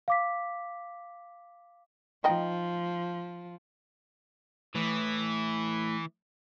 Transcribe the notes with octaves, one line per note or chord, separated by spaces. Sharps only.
F5 D6 B6
F3 D#4 D#5 G5
A2 E3